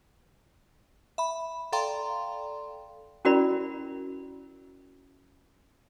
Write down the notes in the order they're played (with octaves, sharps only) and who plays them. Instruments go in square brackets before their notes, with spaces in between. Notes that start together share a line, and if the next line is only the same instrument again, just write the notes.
[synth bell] E5 B5
A4 D5 F5 G5 A#5 C6
[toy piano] C#4 E4 F#4 A#4 D5 B5